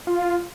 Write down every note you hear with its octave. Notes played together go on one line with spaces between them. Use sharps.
F4